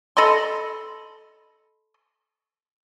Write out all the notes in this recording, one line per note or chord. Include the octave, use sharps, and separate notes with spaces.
A4 D#5 B5 C6